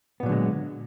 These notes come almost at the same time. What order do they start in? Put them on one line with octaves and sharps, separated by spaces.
B3 A#2 F#3 D3 G#3